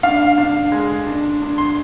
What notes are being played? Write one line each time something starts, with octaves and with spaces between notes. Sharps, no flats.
D4 F5
D4
G#3
D4
D4
C6